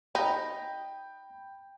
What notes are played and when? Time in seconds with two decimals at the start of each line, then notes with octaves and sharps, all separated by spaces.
0.15 D#4 G5 B5